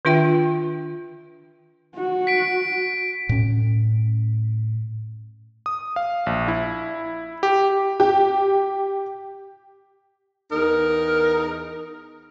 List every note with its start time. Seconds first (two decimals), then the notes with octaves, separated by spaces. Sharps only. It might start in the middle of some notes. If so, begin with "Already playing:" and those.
0.05 D#3 D4 F4 E5 G5
1.95 F#4
2.27 B6 D7
3.29 A2 C#4
5.66 D#6
5.96 F5
6.26 A#1
6.48 E4
7.43 G4
8.00 G4
10.52 E2 D#4 A#4